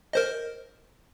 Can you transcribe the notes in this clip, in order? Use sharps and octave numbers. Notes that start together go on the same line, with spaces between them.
A#4 C5 D#5